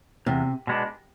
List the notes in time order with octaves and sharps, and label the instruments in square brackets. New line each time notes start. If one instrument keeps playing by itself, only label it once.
[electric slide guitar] E2 [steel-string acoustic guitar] C3
[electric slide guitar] B2 G#3 B3 D4